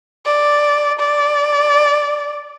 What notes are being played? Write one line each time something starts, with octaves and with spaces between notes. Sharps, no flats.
D5
D5